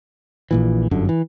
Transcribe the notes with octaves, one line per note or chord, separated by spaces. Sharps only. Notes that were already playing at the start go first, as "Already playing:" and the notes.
A#1 A#2 E3
G1 F#2 D3
E3